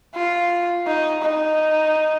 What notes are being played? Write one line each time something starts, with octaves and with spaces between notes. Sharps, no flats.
F4
D#4
D#4